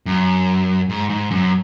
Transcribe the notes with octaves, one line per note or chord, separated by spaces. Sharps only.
F#2
G#2
G#2
F#2